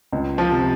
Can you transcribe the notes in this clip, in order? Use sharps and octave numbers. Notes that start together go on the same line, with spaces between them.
C#2
F3
C3